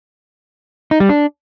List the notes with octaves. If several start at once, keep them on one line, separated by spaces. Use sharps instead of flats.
D#4
G3
D4